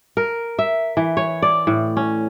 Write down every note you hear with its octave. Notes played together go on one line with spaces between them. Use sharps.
A#4
E5
E3
C#5
D5
A2
C#4